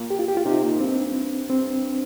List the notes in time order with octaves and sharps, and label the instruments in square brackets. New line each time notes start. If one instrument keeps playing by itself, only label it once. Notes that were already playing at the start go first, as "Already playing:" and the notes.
Already playing: [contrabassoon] A#2
[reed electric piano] G4
F4
G4
F4
[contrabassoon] C3 [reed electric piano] D#4
[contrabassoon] A#2
[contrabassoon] G2 [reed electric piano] C4
[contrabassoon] G2 [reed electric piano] C4